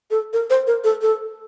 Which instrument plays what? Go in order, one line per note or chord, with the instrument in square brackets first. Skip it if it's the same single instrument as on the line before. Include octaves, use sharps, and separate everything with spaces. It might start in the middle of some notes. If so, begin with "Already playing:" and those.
[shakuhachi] A4
A#4
C5
A#4
A4
A4